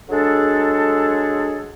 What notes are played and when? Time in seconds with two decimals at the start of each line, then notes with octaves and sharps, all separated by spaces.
0.09 F#3 G#3 D4 G#4 A4